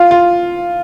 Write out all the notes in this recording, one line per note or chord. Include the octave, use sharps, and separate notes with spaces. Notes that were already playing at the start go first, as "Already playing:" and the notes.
Already playing: F4
F4